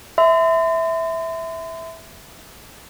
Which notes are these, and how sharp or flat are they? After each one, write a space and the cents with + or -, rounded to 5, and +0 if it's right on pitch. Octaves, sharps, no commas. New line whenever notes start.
E5 -10 C6 -40